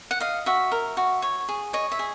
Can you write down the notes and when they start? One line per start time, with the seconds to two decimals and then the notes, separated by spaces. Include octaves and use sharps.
0.11 F#5
0.20 D#5 F5
0.46 F#4 E5
0.72 A#4
0.97 F#4
1.22 C#5
1.49 G#4
1.73 C#5 D#5
1.92 E5
1.99 G#4